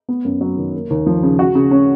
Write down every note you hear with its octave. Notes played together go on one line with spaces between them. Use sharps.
B3
F#2
F#3
D#3
A#3
D#2
F3
C#3
F#4
C#3
C#4